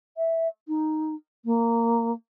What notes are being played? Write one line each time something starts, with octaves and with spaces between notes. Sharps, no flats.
E5
D#4
A#3